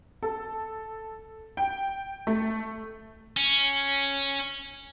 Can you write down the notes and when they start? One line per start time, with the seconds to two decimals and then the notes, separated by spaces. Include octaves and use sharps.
0.23 A4
1.57 G5
2.27 A3
3.37 C#4